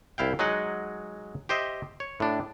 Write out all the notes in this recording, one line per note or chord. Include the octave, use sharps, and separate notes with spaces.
C2 E4 F5 G5
F#3 G#3 D#4 D#5 F#5
G4 C5 D#5 E5
C#5
A2 D4